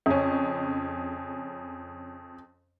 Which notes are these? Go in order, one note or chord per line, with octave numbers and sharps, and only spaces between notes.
F2 C#3 C#4